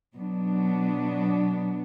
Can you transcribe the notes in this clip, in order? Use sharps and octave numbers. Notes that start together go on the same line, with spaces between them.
B2 F#3 B3 D4